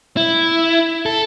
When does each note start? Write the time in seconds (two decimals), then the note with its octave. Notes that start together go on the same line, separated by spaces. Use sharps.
0.17 E4
1.06 A4